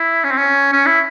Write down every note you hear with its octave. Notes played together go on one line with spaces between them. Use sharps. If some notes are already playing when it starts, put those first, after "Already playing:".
Already playing: E4
C#4
C4
C#4
C#4
E4